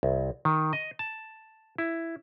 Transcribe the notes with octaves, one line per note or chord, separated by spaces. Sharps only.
C2
D#3
D#5
A5
E4